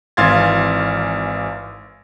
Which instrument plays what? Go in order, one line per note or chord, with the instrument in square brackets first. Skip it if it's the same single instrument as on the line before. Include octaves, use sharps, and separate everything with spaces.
[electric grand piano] G#1 E3 F5 C6 G#6 A6